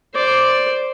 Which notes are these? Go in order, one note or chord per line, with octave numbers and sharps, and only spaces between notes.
C5 D5